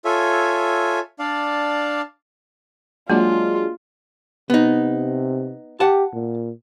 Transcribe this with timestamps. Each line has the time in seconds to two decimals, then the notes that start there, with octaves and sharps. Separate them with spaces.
0.05 F4 A4 C#5 E5 G#5
1.19 D4 D5 F5 A5
3.10 F#3 G#3 A#3 D4 F4
4.50 C3 B3 D#4
5.80 G4 F#5 A5
6.14 A#2